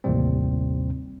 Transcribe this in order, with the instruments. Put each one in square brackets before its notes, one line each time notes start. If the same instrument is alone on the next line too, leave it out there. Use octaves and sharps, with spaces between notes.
[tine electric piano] A1 D#2 A2 C3 G3 C4